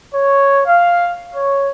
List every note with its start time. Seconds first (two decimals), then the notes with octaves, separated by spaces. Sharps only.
0.13 C#5
0.66 F5
1.35 C#5